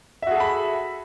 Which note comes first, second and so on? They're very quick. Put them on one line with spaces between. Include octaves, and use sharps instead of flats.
E5 F#4 G#4 A4 B5